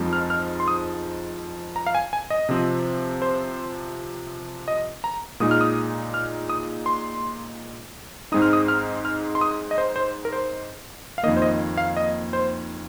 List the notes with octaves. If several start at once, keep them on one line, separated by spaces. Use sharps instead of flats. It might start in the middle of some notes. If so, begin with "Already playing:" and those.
Already playing: F2 F3 G#3 C4 D#4
F6
F6
C6
D#6
A#5
F5
G#5
G#5
D#5
C3 F3 C4
C5
D#5
A#5
A#2 G#3 D#4 D#6
F6
D#6
F6
D#6
C6
G#2 G#3 C4 D#4 D#6
F6
D#6
F6
F6
C6
D#6
D#5
C5
C5
A#4
C5
F5
F2 D#3 A#3 D#5
C5
D#5
F5
D#5
C5